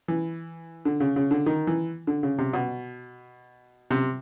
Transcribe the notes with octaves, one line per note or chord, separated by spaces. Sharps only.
E3
D3
C#3
C#3
D3
D#3
E3
D3
C#3
C3
B2
C3